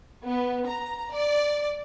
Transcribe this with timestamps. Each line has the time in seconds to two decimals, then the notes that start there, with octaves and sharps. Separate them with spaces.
0.24 B3
0.68 A#5
1.14 D5